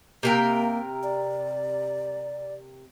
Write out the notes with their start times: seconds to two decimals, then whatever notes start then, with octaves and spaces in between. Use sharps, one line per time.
0.23 C3 A#3 A#4 G5
1.03 D5